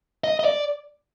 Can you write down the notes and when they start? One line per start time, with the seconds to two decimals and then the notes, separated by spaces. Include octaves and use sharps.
0.24 D#5
0.39 D#5
0.45 D5